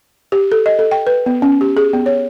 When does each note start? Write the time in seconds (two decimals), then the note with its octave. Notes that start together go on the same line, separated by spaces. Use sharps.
0.32 G4
0.52 A4
0.66 D#5
0.79 A4
0.91 G5
1.07 B4
1.26 B3
1.42 C#4
1.61 G4
1.77 G#4
1.94 B3
2.06 C#5